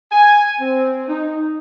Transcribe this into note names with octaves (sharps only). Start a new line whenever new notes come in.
G#5
C4
D#4